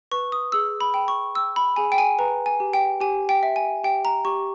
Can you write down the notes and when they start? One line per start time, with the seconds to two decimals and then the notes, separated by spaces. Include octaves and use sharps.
0.11 B4 C#6
0.32 D#6
0.52 G#4 E6
0.81 B5
0.94 G5
1.08 C#6
1.35 G5 E6
1.56 B5
1.76 G#4 G#5
1.92 G5
1.98 G#5
2.19 B4 A#5
2.46 G#5
2.60 G4
2.73 G5
3.01 G4 G#5
3.29 G5
3.43 E5
3.56 G#5
3.84 G4 G5
4.05 A#5
4.25 G4 C#6